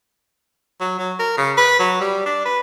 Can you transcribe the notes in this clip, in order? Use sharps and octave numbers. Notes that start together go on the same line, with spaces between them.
F#3
F#3
A#4
C#3
B4
F#3
G3
D4
B4